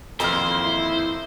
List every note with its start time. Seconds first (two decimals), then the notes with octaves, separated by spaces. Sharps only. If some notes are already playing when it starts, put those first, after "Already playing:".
0.20 F2 D#3 E3 A#3 C5 F6
0.64 E4